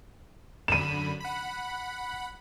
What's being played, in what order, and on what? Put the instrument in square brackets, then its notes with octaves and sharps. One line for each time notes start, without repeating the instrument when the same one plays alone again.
[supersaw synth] F#2 D3 B5 [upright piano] D#7 E7
[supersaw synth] F#5 B5